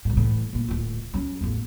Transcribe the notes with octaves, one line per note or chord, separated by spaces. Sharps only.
C2 A2
A2 E3
A#2 A3
D1 F4
F#3 C#4
A1 E2